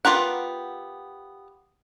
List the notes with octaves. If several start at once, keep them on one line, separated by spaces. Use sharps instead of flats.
B3 F4 G4 A#4 F#5